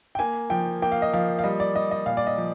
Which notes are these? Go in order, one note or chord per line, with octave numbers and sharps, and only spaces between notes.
G5
A#3 G#5
F3 G5
A#3 G5
F5
D#5
F3 F5
F5
G3 D#5
D5
G3 D#5
D#5
A#2 F5
D5
D#5
F3